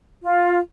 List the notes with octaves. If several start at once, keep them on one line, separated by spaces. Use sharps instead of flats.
F4